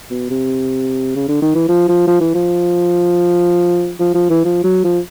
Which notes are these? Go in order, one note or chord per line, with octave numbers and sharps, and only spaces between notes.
B2
C3
C#3
D3
D#3
E3
F3
F3
F3
E3
F3
F3
F3
E3
F3
F#3
F3